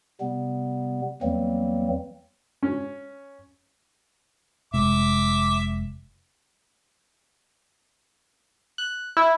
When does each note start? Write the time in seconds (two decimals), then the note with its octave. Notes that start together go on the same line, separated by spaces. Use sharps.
0.21 C3 G3 B3
1.22 E2 E3 F#3 G3 A#3 C4
2.63 C#4
4.74 F1 C3 G#3 E5 D6
8.78 F#6
9.17 E4